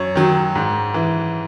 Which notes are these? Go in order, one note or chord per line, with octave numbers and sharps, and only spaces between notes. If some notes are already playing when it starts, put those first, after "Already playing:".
Already playing: F#2 C#5
D#3 F#3
G#2
E3